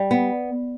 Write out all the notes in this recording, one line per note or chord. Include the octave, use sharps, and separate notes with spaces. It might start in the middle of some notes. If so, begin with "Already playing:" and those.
Already playing: G3
B3